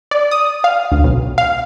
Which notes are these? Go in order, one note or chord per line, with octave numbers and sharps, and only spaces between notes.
D5
D#6
F5
D2
B1
F5